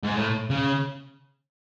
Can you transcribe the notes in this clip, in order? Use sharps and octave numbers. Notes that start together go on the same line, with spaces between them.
G#2
A2
C#3